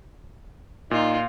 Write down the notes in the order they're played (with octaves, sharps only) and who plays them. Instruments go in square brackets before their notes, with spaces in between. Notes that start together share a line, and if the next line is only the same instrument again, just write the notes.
[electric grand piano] A#2 [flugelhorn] D#4 [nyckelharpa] F4